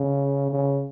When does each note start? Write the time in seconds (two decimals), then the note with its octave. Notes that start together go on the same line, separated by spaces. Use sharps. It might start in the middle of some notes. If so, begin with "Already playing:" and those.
Already playing: C#3
0.51 C#3